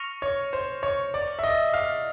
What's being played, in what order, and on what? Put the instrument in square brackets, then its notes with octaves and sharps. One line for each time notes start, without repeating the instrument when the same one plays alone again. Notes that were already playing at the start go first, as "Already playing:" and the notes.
Already playing: [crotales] C#6 F6 A#6 C#7 F7
[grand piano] C#5
C5
C#5
D5
E5
D#5
F5